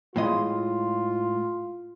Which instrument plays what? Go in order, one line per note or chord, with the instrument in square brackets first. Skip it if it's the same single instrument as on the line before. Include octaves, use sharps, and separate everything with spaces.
[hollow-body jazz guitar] A2 G#3 D#5 [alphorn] F4